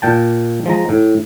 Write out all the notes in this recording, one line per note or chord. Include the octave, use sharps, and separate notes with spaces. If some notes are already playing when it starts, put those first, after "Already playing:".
A#2 G5 A5
F3 G#3 A#5
A2